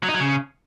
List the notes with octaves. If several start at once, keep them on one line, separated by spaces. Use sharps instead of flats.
F#3
D#4
F#3
C#3